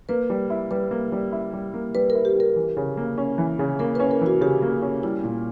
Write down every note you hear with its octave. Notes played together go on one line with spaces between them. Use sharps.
A#3 B4
G3
E4
G3 B4
A#3
G3
E4
G3
A#3
G3 B4
A#4
E4
G4
G3 A#4
E3
C#3
A#3
C#4
E3
C#3
A#3 A#4
B4
C#4
A#4
E3 F#4
C#3 G4
A#3
C#4
G3 E4
A#2